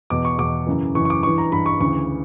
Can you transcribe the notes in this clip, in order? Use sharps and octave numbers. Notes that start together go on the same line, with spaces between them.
E2 B2 D6
C#6
E2 B2 D6
F#2 C#3 E3
F#2 C#3 E3 C#6
C#6
D6
G2 E3 C#6
A#5
G2 E3 B5
C#6
D2 C#3 E3 C#6